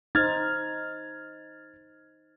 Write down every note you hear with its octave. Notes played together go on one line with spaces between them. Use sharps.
D#4 C5 F6 G#6 A6